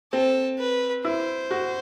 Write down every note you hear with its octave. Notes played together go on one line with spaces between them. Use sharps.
C4 A4
B4
E4 C5
F#4